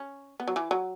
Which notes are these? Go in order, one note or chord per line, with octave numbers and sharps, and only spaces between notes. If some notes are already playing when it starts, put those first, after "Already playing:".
Already playing: C#4
B3
F#3
E3
F#3